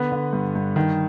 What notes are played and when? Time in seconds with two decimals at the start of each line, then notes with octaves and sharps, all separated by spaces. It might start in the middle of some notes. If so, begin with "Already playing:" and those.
Already playing: D3 B3 B4
0.12 D3
0.33 G2
0.55 G2
0.76 D#3